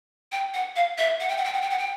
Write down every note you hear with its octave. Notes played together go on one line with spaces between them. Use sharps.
G5
F#5
F5
E5
F#5
G5
F#5
G5
F#5
G5
F#5
G5